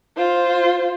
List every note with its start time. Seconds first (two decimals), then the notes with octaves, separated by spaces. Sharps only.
0.17 F4 C5